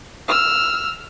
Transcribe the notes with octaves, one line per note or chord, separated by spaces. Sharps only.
E6 F6